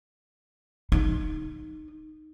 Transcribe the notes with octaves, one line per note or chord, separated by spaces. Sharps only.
D#4